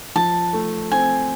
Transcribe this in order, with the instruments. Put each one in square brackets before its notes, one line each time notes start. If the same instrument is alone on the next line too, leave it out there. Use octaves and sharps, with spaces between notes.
[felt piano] F3 [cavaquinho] A5
[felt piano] A3
[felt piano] C4 [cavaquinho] G#5